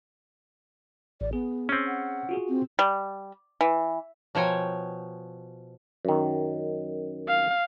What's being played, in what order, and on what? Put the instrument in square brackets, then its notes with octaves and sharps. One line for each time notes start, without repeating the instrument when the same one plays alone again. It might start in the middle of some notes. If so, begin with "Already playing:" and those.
[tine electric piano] A1 [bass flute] D5
[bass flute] B3 [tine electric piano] G#4
[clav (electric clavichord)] C4 C#4
[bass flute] F#5
[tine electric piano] F4 F#4 G#4
[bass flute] C4
[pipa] G3
E3
[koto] B2 F3 C#5 G5 G#5 A#5
[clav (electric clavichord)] F#2 D#3
[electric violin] F5